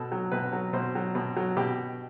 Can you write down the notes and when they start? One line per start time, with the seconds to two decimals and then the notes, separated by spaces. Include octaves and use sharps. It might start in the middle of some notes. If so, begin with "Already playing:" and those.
Already playing: B2 A4
0.12 F#3
0.32 B2 B4
0.53 F#3
0.73 B2 C5
0.95 F#3
1.15 B2
1.36 F#3
1.57 B2 G4